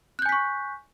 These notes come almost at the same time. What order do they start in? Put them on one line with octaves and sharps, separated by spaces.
F#6 G6 G#5 B6 C#6